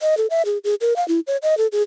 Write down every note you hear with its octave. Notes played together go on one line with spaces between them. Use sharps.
D#5
A4
E5
G#4
G#4
A#4
F5
E4
C#5
D#5
A4
G#4